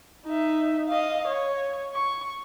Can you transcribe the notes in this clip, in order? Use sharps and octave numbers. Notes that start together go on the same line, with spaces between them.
D#4 E5
D#5 F5
C#5
C#6